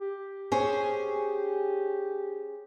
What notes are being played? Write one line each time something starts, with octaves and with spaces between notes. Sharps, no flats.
G4
C#4 G#4 C5